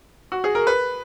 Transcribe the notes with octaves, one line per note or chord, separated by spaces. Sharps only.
F#4
G#4
A#4
B4